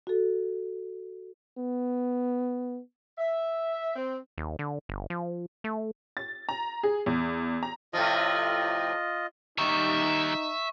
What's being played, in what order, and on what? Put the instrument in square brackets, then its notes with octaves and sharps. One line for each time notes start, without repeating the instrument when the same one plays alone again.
[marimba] F#4 A4
[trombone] B3
[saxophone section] E5
C4
[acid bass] D#2
D3
G1
F3
A3
[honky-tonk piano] A6
A#5
G#4
E2
A#5
[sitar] A2 C3 F3 [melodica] F4 D#5
[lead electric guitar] D#3 G3 [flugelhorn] D#4 [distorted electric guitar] E5 [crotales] C#6